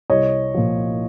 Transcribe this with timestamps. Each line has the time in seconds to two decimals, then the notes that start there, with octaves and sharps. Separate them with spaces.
0.10 C2 C#5 D#5
0.54 A#2 F3